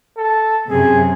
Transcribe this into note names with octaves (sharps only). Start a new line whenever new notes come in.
A4
F#2 C3 G#4